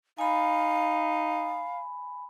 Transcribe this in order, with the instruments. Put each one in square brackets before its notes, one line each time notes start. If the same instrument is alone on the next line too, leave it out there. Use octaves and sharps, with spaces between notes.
[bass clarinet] D#4 [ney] F5 [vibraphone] G#5 B5